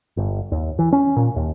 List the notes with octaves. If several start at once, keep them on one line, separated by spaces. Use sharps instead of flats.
G1
D#2
E3
C#4
A#2
D#2